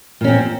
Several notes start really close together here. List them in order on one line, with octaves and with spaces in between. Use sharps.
A#2 C#4 C4